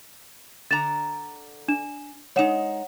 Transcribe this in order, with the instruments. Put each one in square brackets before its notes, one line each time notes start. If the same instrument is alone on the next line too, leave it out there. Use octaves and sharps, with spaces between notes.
[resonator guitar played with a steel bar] D3 A#5 [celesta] A6 E7
[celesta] D4 E7
[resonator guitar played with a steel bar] G#3 D#4 [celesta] C#5 F#5 E7